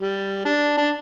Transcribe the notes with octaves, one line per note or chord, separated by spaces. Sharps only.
G3
D4
D4